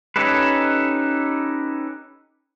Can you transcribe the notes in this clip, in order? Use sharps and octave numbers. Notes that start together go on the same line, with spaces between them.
C#4 D#4 G4 A4 B4